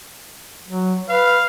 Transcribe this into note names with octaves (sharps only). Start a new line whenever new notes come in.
F#3
B4 F5